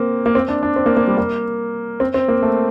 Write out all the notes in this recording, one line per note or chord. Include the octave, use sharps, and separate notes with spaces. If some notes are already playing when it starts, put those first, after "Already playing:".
Already playing: A#3 C4
A#3
C4
D4
D4
C4
A#3
A#3
G3
A#3
C4
C4
A#3
A3